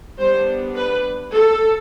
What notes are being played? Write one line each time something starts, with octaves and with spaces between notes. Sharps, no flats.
G3 B3 D4 C5
B4
A4